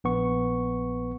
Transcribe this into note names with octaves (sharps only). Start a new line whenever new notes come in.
A#1 B3 C#6